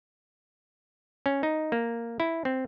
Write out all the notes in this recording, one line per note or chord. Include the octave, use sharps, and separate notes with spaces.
C#4
D#4
A#3
E4
C4